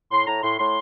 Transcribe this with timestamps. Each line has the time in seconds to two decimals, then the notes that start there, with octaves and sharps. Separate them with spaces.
0.12 A2 C6
0.27 A2 A#5
0.43 A2 C6
0.59 A2 C6